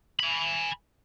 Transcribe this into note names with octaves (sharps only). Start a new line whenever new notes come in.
G#5 B5